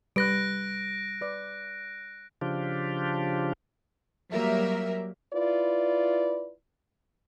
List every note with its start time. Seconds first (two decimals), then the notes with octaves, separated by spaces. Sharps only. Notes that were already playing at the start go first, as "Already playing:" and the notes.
0.16 G3 B4 F#6 A#6 D7
1.21 B4 D5
2.41 C#3 F3 D4 F4 G4
4.31 F#3 G3 A#3 A#4 E5
5.34 E4 F4 B4 D5